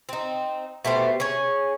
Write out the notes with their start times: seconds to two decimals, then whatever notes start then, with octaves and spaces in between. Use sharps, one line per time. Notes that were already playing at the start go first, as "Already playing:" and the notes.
0.09 C4 D#4
0.84 B2 A3 G4 C5
1.20 C#4 G#4 C#5